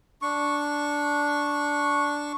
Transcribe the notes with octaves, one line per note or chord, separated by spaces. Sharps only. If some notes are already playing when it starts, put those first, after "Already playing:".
D4 C#6